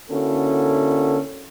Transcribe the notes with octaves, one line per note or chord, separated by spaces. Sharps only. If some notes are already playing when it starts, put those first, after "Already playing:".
D3 A#3 C#4 E4 F#4 A4